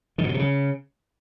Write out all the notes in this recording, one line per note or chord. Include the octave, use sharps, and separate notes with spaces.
D#3
A#2
B2
C3
C#3